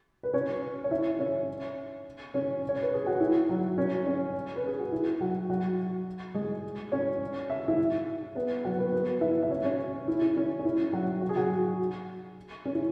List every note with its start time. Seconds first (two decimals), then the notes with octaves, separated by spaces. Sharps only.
0.23 B4
0.33 C#4 C#5
0.84 C#5
0.91 E4 E5
1.19 C#4 C#5
2.34 C#4 C#5
2.69 C#5
2.82 B4
2.94 G#4
3.06 F#4
3.21 E4
3.49 F#3 F#4
3.78 C#4
4.06 C#4
4.56 B4
4.67 G#4
4.79 F#4
4.92 E4
5.20 F#3 F#4
5.50 F#3 F#4
6.34 G#3 G#4
6.92 C#4 C#5
7.50 E5
7.68 E4 E5
8.35 B3 B4
8.65 F#3 F#4
8.79 B3 B4
8.92 B3 B4
9.21 E4 E5
9.42 E5
9.51 C#4 C#5
9.64 C#4 C#5
10.08 E4
10.22 E4
10.37 C#4
10.59 C#4
10.65 E4
10.93 F#3 F#4
11.21 F#4
11.29 G#4
11.36 F#3 F#4
12.65 C#4
12.75 E4